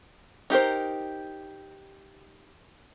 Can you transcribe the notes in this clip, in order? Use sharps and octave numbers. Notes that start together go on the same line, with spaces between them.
D#4 G4 A#4 C5